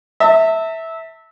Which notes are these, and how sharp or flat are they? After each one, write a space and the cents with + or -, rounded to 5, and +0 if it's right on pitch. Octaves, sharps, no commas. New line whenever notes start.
E5 -15 A5 +35